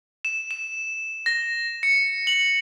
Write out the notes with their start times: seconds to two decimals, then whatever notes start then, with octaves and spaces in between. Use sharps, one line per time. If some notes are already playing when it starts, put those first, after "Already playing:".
0.25 E7
0.51 E7
1.26 A#6
1.83 C#7
2.27 F#7